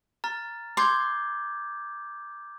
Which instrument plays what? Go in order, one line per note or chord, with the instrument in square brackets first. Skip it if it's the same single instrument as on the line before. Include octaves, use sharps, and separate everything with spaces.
[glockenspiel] A#5 F6 A6
[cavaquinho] C6 [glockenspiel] D6 G6 G#6